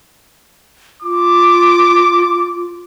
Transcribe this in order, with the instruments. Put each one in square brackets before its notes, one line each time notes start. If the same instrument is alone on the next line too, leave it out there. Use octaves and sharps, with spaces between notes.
[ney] F4 [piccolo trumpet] D6